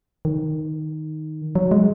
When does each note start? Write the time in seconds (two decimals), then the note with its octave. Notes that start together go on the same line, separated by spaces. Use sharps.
0.25 D#3
1.55 F#3
1.71 G#3